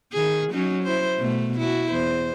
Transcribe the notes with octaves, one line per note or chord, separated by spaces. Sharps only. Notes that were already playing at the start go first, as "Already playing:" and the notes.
D#3 G#4
F#3 C#4 D#4
E4 C5
B2 A3
E4 F#4
E2 C5